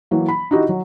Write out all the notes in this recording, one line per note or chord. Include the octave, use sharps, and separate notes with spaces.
E3 F#3 A#3
B5
D#4 E4 F#4 G4 D#5
F#3